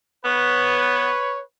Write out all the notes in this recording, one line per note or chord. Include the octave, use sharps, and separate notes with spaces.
B3 B4 C#5